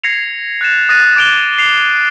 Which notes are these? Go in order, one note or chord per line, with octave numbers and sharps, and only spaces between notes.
G#6 A#6 C7 C#7 F7
F#6 A6 E7
D#6 F#6 A6 A#6 D#7 E7
D6 G#6 D7 F7 G7
C7 F7